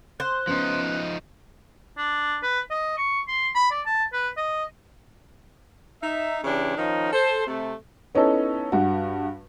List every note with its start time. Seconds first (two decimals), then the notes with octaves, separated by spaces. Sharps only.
0.20 C5 F#6
0.47 F3 B3 C#4 D#4
1.98 D4
2.43 B4
2.71 D#5
2.98 C#6
3.28 C6
3.55 B5
3.71 D5
3.86 A5
4.13 B4
4.37 D#5
6.03 D#4 E5
6.44 C#3 E3 D4 G4 C#5
6.77 D#3 F3 C#4 D#4
7.13 A4 C5
7.47 C3 A3
8.15 B3 C#4 D#4 E4 A4
8.72 G2 F#4